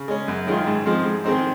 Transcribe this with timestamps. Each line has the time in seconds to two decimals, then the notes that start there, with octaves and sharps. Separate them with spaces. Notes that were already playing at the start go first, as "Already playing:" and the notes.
Already playing: C#3
0.08 G#3 C#4
0.28 F#2
0.47 D#3 G#3 C#4 F4
0.67 G#2
0.86 F3 G#3 C4
1.05 G#2
1.24 D#3 G#3 C4 D#4